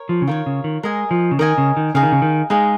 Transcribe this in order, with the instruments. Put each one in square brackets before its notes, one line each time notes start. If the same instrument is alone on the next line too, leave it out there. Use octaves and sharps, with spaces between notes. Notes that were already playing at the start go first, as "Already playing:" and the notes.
Already playing: [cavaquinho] A#4 C#5
[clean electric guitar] F3
C#3
[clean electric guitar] D#3 [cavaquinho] F4 A#4 C#5
[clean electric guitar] C#3
D#3
[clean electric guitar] G#3 [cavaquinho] A#4 D#5 G#5
[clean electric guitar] F3
C#3
[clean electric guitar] D#3 [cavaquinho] A#4 D#5 G#5
[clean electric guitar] C#3
D#3
[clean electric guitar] C#3 [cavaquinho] D#4 G#4 F5
[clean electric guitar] D#3
C#3
D#3
[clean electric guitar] G#3 [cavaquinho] D#4 G#4 F5